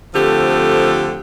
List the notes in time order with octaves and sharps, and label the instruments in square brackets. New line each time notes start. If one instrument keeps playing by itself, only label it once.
[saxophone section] D3 F3 A3 C4 G4